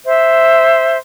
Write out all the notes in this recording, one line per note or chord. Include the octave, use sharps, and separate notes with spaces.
C5 E5